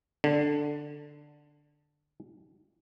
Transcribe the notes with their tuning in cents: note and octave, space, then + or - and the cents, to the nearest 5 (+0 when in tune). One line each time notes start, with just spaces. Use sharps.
D3 +5